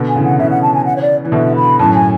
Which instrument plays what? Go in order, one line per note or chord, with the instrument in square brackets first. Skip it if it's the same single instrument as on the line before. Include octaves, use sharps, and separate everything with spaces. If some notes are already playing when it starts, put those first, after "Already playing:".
Already playing: [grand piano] B2 D3
[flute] G#5
[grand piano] C#3 E3
[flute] F#5
[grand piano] C#3 E3 [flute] E5
[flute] F#5
A5
G#5
F#5
C#5
D5
[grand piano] E3
[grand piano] B2 D3 [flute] E5
[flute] B5
[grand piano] F#2 A2 [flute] A5
[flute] G#5